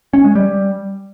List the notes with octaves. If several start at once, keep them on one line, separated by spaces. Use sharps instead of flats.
C#4
G#3
G3